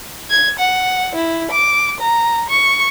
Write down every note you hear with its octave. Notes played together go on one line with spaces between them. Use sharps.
G#6
F#5
E4
D6
A#5
C#6